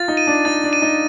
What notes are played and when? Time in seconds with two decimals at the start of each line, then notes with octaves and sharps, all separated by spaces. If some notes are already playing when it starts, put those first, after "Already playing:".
Already playing: F4 A6
0.08 D#4
0.17 D#7
0.27 D4
0.45 D#4 A6
0.64 D4
0.73 D#7
0.82 D#4